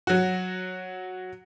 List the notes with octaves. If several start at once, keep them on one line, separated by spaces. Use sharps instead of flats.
F#3 F#4